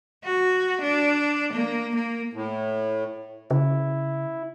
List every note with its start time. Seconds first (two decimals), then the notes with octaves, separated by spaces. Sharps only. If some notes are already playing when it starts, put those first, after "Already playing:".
0.24 F#4
0.81 D4
1.52 A#3
1.95 A#3
2.34 A2
3.51 C#3 E4